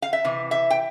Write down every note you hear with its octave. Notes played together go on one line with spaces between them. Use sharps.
F5
E5
C3 E3
E5
G5